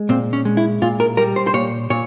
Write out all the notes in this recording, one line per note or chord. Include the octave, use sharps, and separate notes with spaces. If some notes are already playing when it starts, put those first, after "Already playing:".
Already playing: G#3
A#2 C4
C#4
G#3
E4
A#2 F4
A#4
G3 A#4
C5
C5
A#2 C#5
A#2 C#5